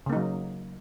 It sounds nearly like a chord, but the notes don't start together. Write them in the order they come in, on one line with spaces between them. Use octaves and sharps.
C#3 A#3 D#4 F#3